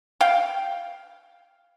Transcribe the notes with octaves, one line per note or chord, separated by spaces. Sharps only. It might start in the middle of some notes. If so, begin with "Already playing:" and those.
F5 G5